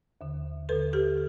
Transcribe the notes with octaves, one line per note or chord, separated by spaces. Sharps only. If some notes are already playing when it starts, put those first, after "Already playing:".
D#2 D3
D#2 D3 A4 B4
G4 A4